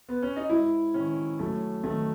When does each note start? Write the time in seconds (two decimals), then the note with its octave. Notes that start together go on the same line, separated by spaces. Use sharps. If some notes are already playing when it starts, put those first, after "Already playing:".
0.09 B3
0.22 C#4
0.36 D#4
0.49 G#2 E4
0.94 D#3 C#4
1.39 F#2 A3
1.84 D#3 A3